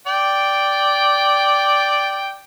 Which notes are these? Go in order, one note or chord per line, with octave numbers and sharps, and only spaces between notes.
D5 G5